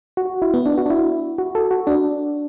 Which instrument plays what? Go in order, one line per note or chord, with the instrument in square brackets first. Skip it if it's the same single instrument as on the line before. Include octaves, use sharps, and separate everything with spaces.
[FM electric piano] F#4
E4
B3
D4
F#4
D4
E4
F#4
A4
F#4
D4